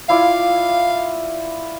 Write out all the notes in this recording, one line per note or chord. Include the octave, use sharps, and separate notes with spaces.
E4 F4 D5 F5